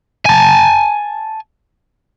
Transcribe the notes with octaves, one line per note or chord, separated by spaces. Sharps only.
G#5 A5